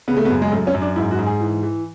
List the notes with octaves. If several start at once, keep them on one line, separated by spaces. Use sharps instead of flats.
C#3 B3
A3
B3
F#2
G#3
F#2 A3
C#4
F#2
D4
G#2 E4
F#4
G#2
G#4
E3
E3